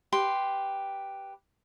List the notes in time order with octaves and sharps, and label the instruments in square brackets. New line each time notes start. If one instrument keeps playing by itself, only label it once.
[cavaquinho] G4 B4 C6